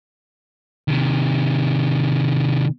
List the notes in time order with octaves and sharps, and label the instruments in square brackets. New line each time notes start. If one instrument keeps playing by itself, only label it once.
[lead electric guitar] C3 D#3